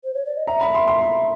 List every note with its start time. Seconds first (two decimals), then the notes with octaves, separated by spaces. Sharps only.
0.04 C5
0.14 C#5
0.26 D5
0.36 D#5
0.47 E5 A#5
0.61 B5
0.74 C6
0.87 C6